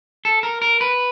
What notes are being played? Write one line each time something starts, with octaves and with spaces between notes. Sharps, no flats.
A4
A#4
A#4
B4